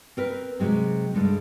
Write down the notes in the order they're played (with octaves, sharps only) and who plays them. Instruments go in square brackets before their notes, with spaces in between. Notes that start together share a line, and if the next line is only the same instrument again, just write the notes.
[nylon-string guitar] C4 A#4 B4
C3 F#3 G#3 C4
G2 D3 G#3